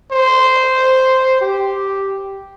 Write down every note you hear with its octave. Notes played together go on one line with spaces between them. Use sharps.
C5
G4